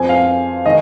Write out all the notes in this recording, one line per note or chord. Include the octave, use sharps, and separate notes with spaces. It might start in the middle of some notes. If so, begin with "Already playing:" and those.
Already playing: F2 F3 C4 G#5
F5
D#3 D#5